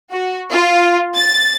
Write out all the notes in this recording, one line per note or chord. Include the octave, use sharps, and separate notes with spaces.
F#4
F4
A6